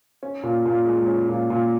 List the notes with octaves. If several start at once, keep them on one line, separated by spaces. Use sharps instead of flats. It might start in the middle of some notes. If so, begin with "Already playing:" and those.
C#4
A#2
A#2
G#3
C#4
A#2
A#2